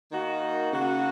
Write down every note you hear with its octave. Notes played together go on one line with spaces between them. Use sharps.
D#3 A#3 D#4 F#4
C#3 A#3 F#4